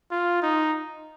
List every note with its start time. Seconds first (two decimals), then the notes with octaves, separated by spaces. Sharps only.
0.11 F4
0.43 D#4